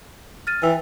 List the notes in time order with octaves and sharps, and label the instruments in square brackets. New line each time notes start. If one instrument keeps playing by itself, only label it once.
[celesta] F6 A6 D#7
[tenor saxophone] E3 [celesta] G5